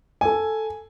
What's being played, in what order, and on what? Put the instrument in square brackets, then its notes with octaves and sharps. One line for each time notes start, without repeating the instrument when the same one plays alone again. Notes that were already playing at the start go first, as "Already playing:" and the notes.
[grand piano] A4 G#5